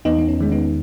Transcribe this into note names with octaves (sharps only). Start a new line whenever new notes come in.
E2 B3 D#4
B3
C#4
D#3 G#3
B3 D#4